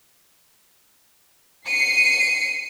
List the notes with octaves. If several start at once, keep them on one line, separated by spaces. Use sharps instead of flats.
C7 C#7 D#7